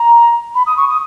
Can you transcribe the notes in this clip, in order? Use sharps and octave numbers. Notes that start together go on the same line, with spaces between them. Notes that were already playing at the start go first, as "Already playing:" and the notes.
Already playing: A#5
B5
D#6
C#6
D#6